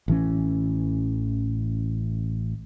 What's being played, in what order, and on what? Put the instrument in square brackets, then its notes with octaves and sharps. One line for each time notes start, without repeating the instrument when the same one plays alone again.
[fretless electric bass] A1 E3 C#4